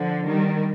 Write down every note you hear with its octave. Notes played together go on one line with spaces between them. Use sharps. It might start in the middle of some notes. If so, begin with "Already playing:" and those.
Already playing: D3 F3
D#3 G3